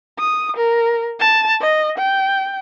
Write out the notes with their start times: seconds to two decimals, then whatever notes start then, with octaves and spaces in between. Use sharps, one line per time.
0.18 D#6
0.57 A#4
1.20 A5
1.61 D#5
1.98 G5